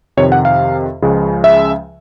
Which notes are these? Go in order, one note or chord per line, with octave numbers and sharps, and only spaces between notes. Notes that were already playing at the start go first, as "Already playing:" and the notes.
F2 C3 D#3 C#5
F#5
F5
C#2 C#3 F3 G#3
E5